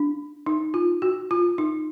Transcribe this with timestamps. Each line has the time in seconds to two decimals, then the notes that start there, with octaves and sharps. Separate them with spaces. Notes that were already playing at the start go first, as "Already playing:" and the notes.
Already playing: D4
0.46 D#4
0.74 F4
1.02 F#4
1.31 F4
1.58 D#4